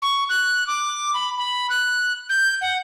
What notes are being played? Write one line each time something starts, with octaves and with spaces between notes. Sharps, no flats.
C#6
F#6
D6
B5
B5
F#6
G6
F#5